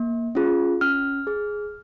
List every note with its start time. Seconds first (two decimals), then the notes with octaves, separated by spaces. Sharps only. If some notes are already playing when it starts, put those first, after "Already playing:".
Already playing: A#3
0.35 C#4 F4 G#4
0.81 C#4 F6
1.27 G#4